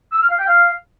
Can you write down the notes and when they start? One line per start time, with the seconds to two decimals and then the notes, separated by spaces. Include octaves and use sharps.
0.12 E6
0.21 F6
0.30 F5
0.39 G5
0.47 F5